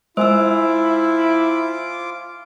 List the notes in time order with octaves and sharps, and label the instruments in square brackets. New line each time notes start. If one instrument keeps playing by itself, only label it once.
[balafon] G#3 [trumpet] E4 [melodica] F4 D6 [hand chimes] C5 G#5 E6